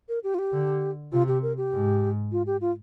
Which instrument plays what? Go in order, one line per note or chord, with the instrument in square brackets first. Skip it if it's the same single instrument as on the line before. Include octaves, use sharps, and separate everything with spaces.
[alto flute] A#4
G4
F4
G4
[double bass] D3
[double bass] C3 [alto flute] F4
[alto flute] G4
A#4
G4
[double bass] G#2
[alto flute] F4
G4
F4